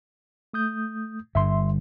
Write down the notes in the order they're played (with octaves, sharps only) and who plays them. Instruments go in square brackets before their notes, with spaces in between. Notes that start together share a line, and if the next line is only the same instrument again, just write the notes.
[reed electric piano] A3 D#6 G6
[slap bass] G1 G2 [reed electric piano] E5 C6